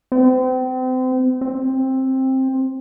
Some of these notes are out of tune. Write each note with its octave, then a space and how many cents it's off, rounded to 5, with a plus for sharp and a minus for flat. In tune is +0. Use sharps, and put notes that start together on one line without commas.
C4 -35
C4 +10